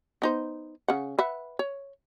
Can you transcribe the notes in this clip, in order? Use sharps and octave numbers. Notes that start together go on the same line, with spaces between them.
B3 D#4 C5
C#3 F#5
B4 E5 F#5
C#5